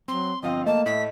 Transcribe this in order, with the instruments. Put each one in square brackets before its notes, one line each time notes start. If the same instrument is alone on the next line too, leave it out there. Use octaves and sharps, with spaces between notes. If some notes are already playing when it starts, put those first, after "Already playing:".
[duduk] F#3 [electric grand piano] C4 [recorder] C6
[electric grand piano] G1 F3 F5 [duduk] C4 [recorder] D#5
[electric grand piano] A3 [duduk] A#3 [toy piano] D#5 [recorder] A5
[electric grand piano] A2 [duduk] A3 [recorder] B6